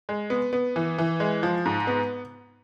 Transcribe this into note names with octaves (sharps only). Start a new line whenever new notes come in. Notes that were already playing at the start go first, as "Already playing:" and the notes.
G#3
B3
B3
E3
E3
G#3
F3
G#2
B3